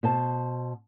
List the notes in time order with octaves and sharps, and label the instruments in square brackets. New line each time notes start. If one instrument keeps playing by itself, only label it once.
[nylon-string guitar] B2 C5 A5